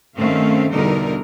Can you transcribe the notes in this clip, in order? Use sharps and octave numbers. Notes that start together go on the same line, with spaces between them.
G2 D#3 A3 C4 C#4 F5
E2 B2 D3 G3 D#4 A#4